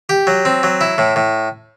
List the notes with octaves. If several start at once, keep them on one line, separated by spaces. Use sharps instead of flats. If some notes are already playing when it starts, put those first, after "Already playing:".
G4
F#3
C4
F#3
E4
A2
A2